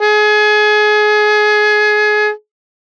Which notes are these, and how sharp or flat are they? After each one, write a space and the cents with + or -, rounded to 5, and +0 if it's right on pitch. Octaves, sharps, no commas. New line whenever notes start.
G#4 +25